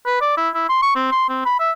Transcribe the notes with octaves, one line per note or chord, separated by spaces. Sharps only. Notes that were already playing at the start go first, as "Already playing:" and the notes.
B4
D5
E4
E4
C6
C#6
C4
C6
C4
B5
E5